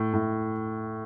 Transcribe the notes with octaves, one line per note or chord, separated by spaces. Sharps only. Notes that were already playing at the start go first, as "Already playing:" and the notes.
Already playing: A2
A2